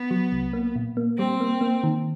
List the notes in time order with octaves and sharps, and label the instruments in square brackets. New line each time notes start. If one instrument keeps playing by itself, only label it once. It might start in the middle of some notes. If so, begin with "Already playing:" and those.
Already playing: [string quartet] B3
[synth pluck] F#3
C2
A#3
A#2
A#3
[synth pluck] G3 [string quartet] C4
[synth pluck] A#3
A#3
D#3